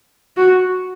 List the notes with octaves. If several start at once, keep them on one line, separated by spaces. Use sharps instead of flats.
F#4